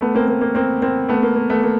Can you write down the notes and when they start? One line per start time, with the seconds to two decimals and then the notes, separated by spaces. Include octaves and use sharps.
0.01 A3 B3
0.15 A#3 C4
0.28 A#3
0.41 A#3
0.55 A#3 C4
0.82 A#3 C4
1.09 A3 B3
1.23 A#3
1.36 A#3
1.50 A3 B3
1.63 A#3